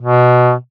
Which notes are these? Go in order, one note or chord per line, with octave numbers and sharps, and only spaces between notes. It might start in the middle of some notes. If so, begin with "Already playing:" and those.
B2